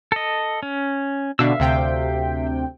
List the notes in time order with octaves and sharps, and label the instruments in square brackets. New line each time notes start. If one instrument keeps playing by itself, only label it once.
[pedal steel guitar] A4 D#5
C#4
[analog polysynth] B2 D3 [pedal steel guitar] E5 F5 E6
[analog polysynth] D2 C3 G5